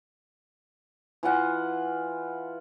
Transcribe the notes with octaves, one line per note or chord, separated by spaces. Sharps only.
E3 F4 F#5